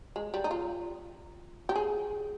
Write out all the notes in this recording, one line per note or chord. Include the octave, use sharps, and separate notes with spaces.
G#3
G3
D#4
F4
G4
G#4